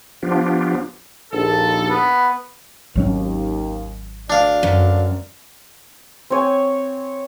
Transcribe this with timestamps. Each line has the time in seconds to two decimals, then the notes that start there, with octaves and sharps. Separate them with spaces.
0.23 F3 B3 D4 F4 G4
1.33 A#1 D#2 A4
1.88 B3
2.96 G#1 D#2 F#3 C#4
4.30 D2 D4 D5 F5
4.63 F#2
6.30 C4 C#5 G#5